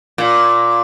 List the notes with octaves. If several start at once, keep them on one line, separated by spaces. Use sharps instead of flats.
A#2